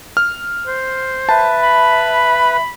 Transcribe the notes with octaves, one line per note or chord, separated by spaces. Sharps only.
F6
C5
B4 E5 A5
B5